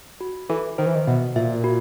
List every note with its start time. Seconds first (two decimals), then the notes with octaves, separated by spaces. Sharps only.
0.21 F#4
0.49 E3 A4
0.78 D#3 C5
0.86 E3
0.95 D#3
1.07 B2 E5
1.36 A#2 E5
1.64 F#4